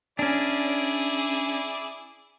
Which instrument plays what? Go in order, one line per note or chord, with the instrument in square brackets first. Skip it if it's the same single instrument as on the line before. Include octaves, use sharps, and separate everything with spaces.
[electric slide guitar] C#4 D4 [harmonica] E4 G#4 D5